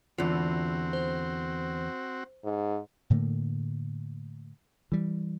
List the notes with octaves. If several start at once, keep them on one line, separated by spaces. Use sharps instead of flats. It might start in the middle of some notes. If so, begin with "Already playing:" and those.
E2 D3 E3 C4 F4 F#4
C5
G#2
A2 D3 A3 A#3
E3 G3